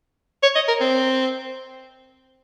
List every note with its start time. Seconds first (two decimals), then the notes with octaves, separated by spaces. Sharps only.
0.43 C#5
0.55 D#5
0.68 A#4
0.81 C4